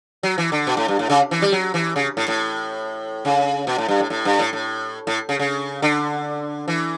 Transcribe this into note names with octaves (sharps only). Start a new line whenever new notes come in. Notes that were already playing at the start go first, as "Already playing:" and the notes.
F#3
E3
D3
B2
A2
G2
A2
C#3
E3
G3
F#3
E3
C#3
A2
A2
C#3
B2
A2
G2
A2
A2
G2
A2
A2
A2
C#3
C#3
D3
E3